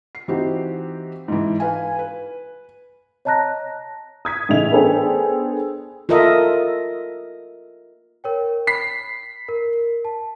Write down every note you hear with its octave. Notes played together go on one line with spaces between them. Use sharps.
C7
E3 C4 D#4 F#4 G4
G#2 E3
B4 F5 G#5
B4
C#5 D#5 A5 A#5 F#6 A#6
D#6 G#6 B6
A2 C#3 E3 D#4 E5 F7
B3 D4 G#4 A4 C5 G5
F4 A4 A#4 D#5 E5
A#4 C#5 G5
B5 B6 C7
A#4
A5